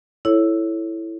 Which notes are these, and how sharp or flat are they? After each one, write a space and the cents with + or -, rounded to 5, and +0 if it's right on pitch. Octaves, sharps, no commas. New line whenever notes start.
E4 +5 A4 +0 C#5 -5